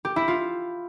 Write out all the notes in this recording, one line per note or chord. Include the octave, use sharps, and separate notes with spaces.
G4
E4
F4